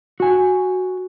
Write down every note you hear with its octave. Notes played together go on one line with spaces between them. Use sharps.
F#4 G#5